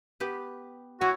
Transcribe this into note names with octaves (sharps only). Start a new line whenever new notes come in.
B3 G4 B4
E4 F#4 C#5 G#5